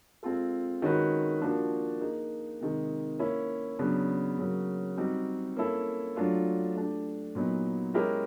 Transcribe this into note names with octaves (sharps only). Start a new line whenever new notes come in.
G#3 C4 F4 A4
D#3 G#3 C#4 F#4 B4
F3 A#3 D4 F#4
A#3 D#4 G#4
C3 D#3 G#3
A#3 C#4 E4
C#3 F#3 B3 D4
C#3 F#3 A#3
G3 C4 D#4 F#4
A#3 C#4 E4 A4
F#3 A3 D4 F4
A3 D4 G4
A#2 F#3 B3 D#4
G#3 C#4 E4 G4 A#4